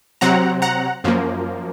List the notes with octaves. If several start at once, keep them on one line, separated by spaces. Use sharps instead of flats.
C3 F#3 C4 F#5 A#5
F#5 A#5
F#2 F3 A#3